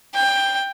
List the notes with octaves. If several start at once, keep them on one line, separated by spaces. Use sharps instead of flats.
G5